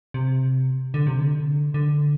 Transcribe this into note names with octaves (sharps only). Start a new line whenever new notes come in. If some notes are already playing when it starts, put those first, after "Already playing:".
C3
D3
C3
D3
D3